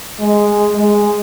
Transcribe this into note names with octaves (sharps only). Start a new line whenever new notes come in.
G#3
G#3